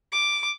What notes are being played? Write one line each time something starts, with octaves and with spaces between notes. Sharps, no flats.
D6